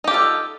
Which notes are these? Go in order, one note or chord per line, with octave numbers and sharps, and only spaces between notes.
D#4 F4 G4 A4